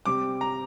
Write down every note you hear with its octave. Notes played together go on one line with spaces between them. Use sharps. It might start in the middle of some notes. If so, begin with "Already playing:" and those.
C3 G3 C4 D6
A#5